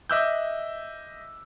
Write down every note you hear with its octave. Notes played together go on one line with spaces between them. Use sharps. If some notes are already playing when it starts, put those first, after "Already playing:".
D#5 E5 D6 E6 F#6 G6